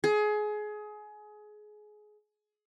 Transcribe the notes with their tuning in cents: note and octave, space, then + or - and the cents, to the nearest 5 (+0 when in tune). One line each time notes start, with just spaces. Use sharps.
G#4 +25